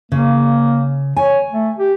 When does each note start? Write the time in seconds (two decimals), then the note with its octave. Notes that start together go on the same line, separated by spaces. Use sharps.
0.12 C#3 A#3
1.16 C#5 G#5
1.51 A3
1.78 G4